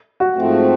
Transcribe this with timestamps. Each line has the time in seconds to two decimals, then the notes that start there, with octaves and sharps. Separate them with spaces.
0.20 F#4
0.35 G#2 F3 A3 C4